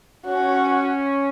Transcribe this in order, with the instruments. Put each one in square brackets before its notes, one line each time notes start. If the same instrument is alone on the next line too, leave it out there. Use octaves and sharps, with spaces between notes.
[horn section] C#4 [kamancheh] F#4